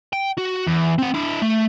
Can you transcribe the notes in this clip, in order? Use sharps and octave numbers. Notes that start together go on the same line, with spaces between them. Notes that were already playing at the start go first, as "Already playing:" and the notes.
G5
F#4
E2
C4 F#5
D4 E4
A3